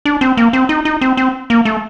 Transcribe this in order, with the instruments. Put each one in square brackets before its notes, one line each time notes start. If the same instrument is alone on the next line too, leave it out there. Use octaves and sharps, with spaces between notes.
[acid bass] D4
C4
A#3
C4
D#4
D#4
C4
C4
A#3
A3